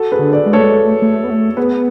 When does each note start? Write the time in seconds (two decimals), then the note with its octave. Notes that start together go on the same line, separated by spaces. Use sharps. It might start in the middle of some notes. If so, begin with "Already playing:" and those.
Already playing: F#4 A4
0.12 G#4 B4
0.19 D3
0.32 B4 D5
0.46 G#3
0.53 A3 A4 C#5
0.62 G#3
0.74 A3
1.02 A3
1.24 B3
1.30 A3
1.57 B3 G#4 B4